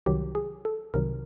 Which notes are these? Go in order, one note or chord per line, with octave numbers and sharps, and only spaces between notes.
C2 C3 D#3 F#3 G4
G#4
A4
C2 C3 D#3 F#3 A#4